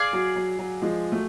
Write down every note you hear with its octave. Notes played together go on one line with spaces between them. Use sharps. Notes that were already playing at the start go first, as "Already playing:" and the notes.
Already playing: G#4 D5 F5
F#3
F#3
F#3
F3 G#3
F#3 A3